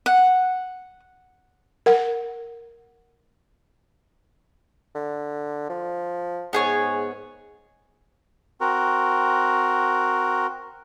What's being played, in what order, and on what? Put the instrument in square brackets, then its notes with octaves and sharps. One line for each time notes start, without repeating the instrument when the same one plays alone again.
[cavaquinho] F#5
[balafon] A#4 F#5
[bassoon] D3
F3
[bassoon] G#2 [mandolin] B3 G#4 C#5
[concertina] C4 F#4 A#4